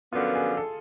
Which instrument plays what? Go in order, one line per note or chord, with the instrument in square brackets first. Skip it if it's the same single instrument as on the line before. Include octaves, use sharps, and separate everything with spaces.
[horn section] F#2 D3 F3 B3 [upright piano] F4
[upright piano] G#4
A4